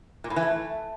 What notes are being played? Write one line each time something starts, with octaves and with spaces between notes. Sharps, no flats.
A#2
A2
E3
A3